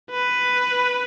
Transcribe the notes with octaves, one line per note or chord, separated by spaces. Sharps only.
B4